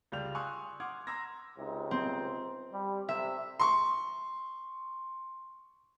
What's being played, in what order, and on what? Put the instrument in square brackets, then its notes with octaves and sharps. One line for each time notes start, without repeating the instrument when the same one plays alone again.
[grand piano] C#2 G3 F4 G6 F7
G#5 C6 C#6 D#6 E6 F#6
F#5 C6 D6 D#6 F6 G#6
A#5 C6 E6 G#6 A#6
[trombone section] C#2 C3 D#4
[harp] C4
[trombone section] G3
[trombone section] C3 [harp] E5
[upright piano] C6 C#6